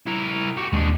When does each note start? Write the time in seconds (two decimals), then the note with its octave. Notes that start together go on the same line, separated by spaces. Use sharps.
0.06 E4 A#4
0.57 F#4 G4
0.73 D#2 G#3 D4